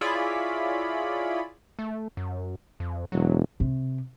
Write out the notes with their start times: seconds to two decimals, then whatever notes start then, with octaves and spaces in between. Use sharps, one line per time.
0.01 E4 F4 G#4 C#5 D5 B5
1.79 A3
2.17 F#2
2.80 F2
3.12 E1 F#3
3.60 C3